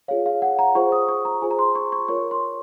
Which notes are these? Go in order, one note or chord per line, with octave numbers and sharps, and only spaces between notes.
F4 G#4 C#5 F5
F5
F#5
A#5
F4 G#4 C5 C#6
D#6
C#6
A#5
F4 G#4 C5 G#5
A#5
C6
C#6
C#6
F4 A#4 C#5 C#6
C6